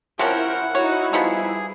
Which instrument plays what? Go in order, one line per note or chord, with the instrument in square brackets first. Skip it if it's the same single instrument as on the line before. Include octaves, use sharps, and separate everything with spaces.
[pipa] C3 F3 C#4 [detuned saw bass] E4 [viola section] A#4 C5 [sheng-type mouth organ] F#5
[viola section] D#4 F#4 [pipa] C#5
[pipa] F3 B3 D#4 [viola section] G3 [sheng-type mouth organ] G#4